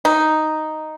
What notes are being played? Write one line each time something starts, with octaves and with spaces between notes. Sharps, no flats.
D#4